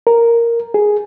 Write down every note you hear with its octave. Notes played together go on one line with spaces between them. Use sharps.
A#4
G#4